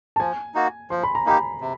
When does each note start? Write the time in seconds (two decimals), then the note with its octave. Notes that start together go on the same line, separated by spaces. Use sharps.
0.16 A5
0.20 F3 G#5
0.55 A#3 D#4 F#4
0.90 F3 C6
1.03 B5
1.15 A#5
1.26 A#3 D#4 G4 B5
1.61 C3